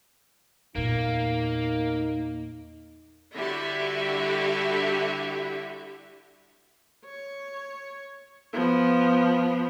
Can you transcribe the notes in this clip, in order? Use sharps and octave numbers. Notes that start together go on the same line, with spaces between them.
E2 A#2 A#3 D#4
D3 G3 E4 F#4 G4 E5
C#5
F3 B3